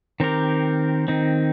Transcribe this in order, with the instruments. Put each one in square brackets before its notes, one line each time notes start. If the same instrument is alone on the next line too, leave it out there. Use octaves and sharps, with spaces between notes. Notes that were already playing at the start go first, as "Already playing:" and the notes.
[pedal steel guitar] D#3 C4 G4 A#4
D#3 C4 D#4